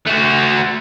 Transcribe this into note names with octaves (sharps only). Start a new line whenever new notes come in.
A3 F#4